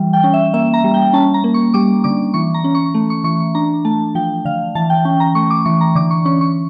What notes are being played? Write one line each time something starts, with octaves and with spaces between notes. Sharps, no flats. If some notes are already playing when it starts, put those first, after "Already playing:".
Already playing: E3 G3
G5
C#4
E5
A#3 E5
A#5
G3
G5
C#4 A5
A#5
A#3
C#6
G3 D6
D3 D6
E3 C#6
A#5
C#4
C#6
A3
C#6
E3 C#6
C#6
D4 A#5
A3 A5
F3 G5
D3 F5
E3 A5
G5
C#4 G5
A#5
A3 C#6
D6
E3 C#6
A#5
D3 D6
C#6
C#4 C#6
C#6